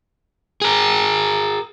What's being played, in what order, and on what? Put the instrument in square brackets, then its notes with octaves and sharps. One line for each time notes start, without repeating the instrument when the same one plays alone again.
[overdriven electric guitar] G#4 A#4